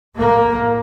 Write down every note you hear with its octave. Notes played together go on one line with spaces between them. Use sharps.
A2 A#3